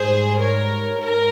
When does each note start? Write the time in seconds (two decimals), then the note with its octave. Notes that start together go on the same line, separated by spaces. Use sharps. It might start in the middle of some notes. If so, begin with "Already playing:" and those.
Already playing: G#2 G3 G#4 C5
0.40 A#4 C#5
1.01 G#2 A#4